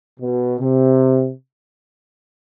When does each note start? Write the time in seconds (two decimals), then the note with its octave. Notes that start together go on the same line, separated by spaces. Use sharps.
0.20 B2
0.60 C3